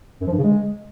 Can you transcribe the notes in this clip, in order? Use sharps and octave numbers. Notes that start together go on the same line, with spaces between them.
F#2
F3
G2
C#3
G#3